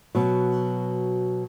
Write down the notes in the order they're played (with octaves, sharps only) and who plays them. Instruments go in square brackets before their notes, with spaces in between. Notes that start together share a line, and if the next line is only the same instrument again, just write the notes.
[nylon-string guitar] B2 F#3